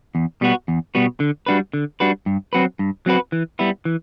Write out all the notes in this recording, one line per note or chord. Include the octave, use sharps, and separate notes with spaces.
E2
B2 G3 B3 F#4
E2
B2 G3 B3 F#4
D3
G3 D4 F#4 B4
D3
G3 D4 F#4 B4
G2
F#3 C4 F#4 B4
G2
F#3 C4 F#4 B4
E3
G3 B3 E4
E3